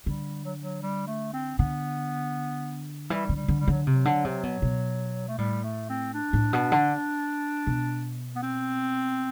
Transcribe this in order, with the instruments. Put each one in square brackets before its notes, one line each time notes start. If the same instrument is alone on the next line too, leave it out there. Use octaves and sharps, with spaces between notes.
[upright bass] D3 [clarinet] G3
[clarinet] F#3
F#3
G3
A3
C4
[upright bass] D3 [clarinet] B3
[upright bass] E3 [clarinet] G3
[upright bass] D3
[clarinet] G3
[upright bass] D3
[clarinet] G3
[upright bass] D3 [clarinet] F#3
[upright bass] C3
[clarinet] F#3
[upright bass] D3
C3
B2
B2
[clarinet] A3
[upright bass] A2 [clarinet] G3
[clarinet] A3
C4
D4
[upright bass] A2
B2
D3
B2
[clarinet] B3
C4